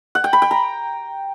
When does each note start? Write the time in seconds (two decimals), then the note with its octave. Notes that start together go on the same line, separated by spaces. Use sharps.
0.15 F#5
0.24 G5
0.33 B5
0.42 G5
0.51 A#5